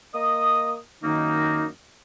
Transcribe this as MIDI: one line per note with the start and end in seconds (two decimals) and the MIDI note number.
0.14 0.74 58
0.14 0.74 75
0.14 0.74 87
1.02 1.66 42
1.02 1.66 51
1.02 1.66 58
1.02 1.66 63